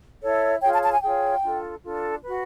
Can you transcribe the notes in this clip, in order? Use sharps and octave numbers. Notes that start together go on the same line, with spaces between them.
E4 A4 C#5
F4 G#4 C#5 G5
A5
A5
G#5
F4 G#4 C#5 G5
D4 F4 A4
D4 F4 A4
F#4 B4